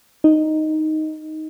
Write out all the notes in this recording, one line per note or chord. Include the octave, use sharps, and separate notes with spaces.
D#4